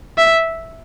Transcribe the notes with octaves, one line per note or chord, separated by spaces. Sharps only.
E5